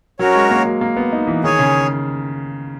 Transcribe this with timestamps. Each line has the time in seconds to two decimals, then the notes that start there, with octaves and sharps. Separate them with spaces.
0.19 F#3 C#4 F#4 A#4 C#5
0.35 G#3
0.51 A#3
0.65 F#3
0.81 A#3
0.97 B3
1.12 D#4
1.28 E3
1.44 D#3 G#4 C#5 G#5
1.59 C#3